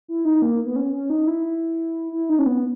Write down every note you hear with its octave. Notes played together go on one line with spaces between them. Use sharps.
E4
D#4
A#3
B3
C#4
C#4
D#4
E4
E4
D#4
C#4
B3